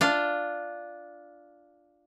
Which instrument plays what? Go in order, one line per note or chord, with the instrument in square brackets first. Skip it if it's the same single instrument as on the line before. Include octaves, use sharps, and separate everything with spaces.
[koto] D4 F4